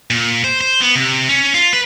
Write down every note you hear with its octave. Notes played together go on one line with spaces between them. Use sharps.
A#2
C5
C5
B3
C3
C#4
F4
B4